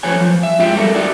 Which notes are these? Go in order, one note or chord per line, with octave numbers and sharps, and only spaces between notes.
F3 A3 B4 C#5 G#5
F3
E5
G#2 F4 E5 G5
F#3 G3 A3 A4 A#4
D#4 F#4 G4 A4 D5 E5